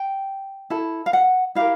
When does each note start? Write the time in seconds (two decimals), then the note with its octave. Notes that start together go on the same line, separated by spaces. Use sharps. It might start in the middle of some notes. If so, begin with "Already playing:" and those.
Already playing: G5
0.70 E4 A4
1.06 F5
1.13 F#5
1.55 E4 G4 A#4 F5